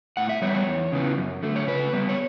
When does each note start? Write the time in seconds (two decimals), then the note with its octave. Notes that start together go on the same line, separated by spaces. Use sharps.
0.17 A2 F#5
0.29 E5
0.42 G3 B3 C#5
0.54 C#5
0.67 E2
0.92 C#3 E3 B3
1.18 F#2
1.43 D3 A3
1.56 C#5
1.67 C#3 B4
1.93 G3 B3
2.09 C#5